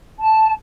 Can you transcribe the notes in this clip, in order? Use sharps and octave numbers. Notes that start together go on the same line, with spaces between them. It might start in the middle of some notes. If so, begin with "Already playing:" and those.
A5